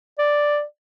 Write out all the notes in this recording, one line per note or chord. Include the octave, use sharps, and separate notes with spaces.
D5